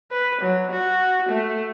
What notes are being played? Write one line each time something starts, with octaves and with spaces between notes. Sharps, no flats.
B4
F#3
F#4
A3